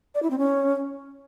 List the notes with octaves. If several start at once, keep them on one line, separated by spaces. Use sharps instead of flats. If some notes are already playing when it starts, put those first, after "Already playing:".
D5
E4
C4
C#4